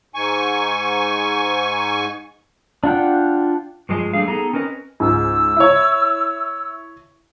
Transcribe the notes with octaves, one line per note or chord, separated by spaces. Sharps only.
G#2 G#5 C#6
D4 F4 F#5 G5
G2 F3 G#3 G#4 D#5
G3 A3 D4 G#4 F5
B3 D#4 G#4 A4 A#5
C4 C#4 A#4 B4 D#5
C#2 G#2 E6
E4 C#5